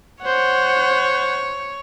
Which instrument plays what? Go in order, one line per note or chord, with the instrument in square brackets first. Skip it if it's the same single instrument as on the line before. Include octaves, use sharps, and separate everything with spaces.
[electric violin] C5 F#5 [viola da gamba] C#5